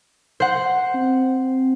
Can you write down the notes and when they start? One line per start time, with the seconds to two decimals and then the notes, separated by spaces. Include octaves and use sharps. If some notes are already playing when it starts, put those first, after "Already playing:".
0.40 C5 F#5
0.94 C4